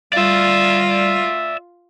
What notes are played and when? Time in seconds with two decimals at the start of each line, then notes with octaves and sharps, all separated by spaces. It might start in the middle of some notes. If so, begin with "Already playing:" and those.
0.13 G3 F4 D5 E5